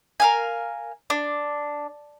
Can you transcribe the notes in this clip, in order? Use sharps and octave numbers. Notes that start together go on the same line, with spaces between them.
A#4 F5 G#5
D4